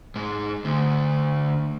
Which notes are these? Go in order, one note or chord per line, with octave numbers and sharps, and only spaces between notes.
G#2
D2